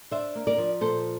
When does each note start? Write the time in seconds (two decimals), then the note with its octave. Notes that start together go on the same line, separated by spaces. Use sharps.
0.11 D4 C5 E5
0.35 A#3
0.47 A#4 D5
0.58 F3
0.81 A#2 A4 C5